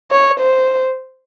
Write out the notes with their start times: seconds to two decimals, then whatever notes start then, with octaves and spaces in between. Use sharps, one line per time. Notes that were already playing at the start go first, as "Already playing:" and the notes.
0.11 C#5
0.40 C5